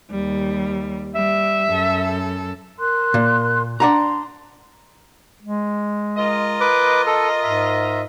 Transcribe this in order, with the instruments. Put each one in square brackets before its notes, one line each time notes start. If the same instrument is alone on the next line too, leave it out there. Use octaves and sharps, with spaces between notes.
[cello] D#2 G3
[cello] G3 [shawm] E5
[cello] F#2 A4
[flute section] A#4 C6 F#6
[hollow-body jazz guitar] A#2
[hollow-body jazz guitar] D4 F#5 A#5 [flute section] C6
[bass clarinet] G#3
[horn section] F4 A#4 D#5
[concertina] B4 D6
A4
[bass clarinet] G#2 [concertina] E5